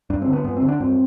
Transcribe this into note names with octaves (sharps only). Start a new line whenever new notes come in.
G2 D4
C4
D3
B3
G2 B3
C4
D3
D4
G2 C4